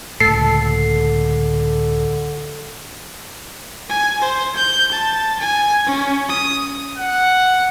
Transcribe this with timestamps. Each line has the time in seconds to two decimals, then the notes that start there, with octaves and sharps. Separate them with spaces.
0.20 C#2 A2 D3 A4 C7
3.89 G#5
4.22 C5
4.56 G6
4.92 A5
5.40 G#5
5.86 C#4
6.29 D#6
6.98 F#5